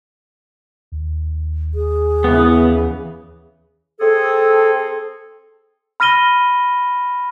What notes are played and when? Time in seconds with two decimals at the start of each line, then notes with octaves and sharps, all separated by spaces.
0.92 D#2
1.74 G#4
2.24 C#3 E3 B3
3.99 C4 G#4 A4
6.00 B5 F6 A#6 D#7 G7